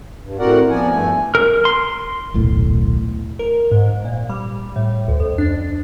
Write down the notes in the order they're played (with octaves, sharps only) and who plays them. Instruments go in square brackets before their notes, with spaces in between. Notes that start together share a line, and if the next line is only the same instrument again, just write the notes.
[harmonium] G2
A2 C4 F#4 A#4 D5 F#5
F3 B3 D5 G#5
G2 A3 G#5
[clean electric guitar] A#4
C6
[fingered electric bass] D#1 B1 A2
[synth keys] A#4
G#2
A#2
G3
A2
D2
F2
D4